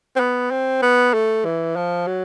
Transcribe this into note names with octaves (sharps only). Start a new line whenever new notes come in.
C4
B3
C4
B3
A3
E3
F3
F#3